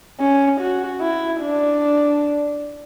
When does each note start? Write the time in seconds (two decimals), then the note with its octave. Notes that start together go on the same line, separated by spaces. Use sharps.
0.20 C#4
0.61 F#4
1.02 E4
1.42 D4